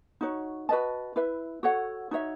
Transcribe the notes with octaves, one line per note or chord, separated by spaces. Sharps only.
D#4 F#4 C#5
F#4 B4 D#5 A5
E4 B4 E5
F#4 A4 C#5 F#5
D#4 F#4 C#5 E5